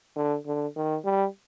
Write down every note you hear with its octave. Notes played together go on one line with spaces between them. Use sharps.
D3
D3
D#3
G3